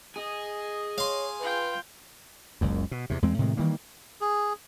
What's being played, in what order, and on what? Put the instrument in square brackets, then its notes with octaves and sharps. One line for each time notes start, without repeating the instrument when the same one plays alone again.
[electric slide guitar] G#4 [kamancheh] D#5
[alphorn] C#5 [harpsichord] F5 C6
[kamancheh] F4 G5 [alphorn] B4
[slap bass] F#1 C#2 F#2
B2
E2 C3
E2 G#3 C4
A2 C3 D#3 G#3
D#3 E3 G3 A#3
[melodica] G#4